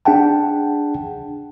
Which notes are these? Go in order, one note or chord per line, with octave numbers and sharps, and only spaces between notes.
D4 G#4 F#5 G5 A5